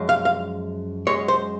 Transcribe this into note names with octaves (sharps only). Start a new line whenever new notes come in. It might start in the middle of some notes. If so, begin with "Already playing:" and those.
Already playing: F#2 F3 G#3
F5
F5
F#2 C#3 G#3 C#5
C5